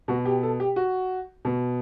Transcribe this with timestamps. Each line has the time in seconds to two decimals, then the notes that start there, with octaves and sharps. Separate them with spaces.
0.08 B2 F#4
0.25 G4
0.43 A4
0.60 G4
0.76 F#4
1.45 B2